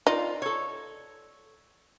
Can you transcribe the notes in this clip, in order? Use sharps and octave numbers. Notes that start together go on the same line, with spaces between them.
D#4 F4 D5
A4 C#5